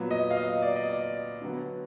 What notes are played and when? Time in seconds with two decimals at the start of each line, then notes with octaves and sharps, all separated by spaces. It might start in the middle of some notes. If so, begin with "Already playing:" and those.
Already playing: A#2 F#3 B3
0.11 D#5
0.30 F5
0.37 D#5
0.62 D5
0.76 D#5
0.89 D5
1.42 D3 F#3 B3